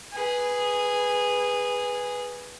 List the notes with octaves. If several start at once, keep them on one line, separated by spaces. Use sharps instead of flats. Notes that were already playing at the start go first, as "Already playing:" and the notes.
G#4 B4